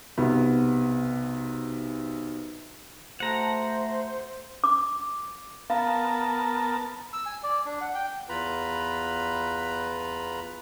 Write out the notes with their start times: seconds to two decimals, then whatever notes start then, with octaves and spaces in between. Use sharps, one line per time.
0.18 B1 C3 B3
3.20 A3 F#4 A4 C5 F#5 A#5
4.64 D6
5.70 B3 A#4 F5 A5
7.13 E6
7.26 G#5
7.43 D5
7.65 D4
7.81 F#5
7.95 G5
8.29 E2 F4 B4 A#5 B5